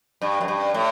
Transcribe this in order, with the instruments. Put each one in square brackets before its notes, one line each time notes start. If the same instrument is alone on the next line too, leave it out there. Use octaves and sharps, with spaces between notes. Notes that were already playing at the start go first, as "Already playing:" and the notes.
[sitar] G2
F#2
G2
A2